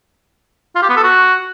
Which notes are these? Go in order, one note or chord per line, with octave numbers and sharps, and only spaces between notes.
F4
G4
B3
A4
F#4